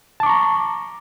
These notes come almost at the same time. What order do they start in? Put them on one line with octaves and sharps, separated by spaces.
A5 D6 C#6 A#5